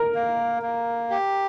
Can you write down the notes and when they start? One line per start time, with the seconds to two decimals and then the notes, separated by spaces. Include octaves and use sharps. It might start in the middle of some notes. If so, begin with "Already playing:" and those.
Already playing: A#4
0.15 A#3
0.62 A#3
1.10 G4